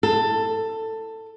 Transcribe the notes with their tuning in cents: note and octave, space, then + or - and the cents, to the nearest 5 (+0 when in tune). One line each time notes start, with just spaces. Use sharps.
A4 +15